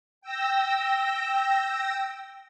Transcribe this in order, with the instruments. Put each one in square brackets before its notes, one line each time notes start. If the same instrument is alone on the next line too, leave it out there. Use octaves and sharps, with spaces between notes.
[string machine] G5 E6 A#6